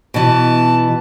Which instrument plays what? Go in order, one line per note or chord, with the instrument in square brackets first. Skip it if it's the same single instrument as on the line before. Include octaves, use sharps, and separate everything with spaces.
[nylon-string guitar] B2 E3 [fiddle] A5